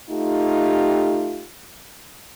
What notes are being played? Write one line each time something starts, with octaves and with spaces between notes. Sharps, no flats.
A3 D#4 F4 G4